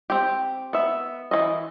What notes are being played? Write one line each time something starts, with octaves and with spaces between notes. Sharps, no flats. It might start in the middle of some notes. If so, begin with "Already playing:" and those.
C4 G4
B3 E5
E3 F#3 E4 D#5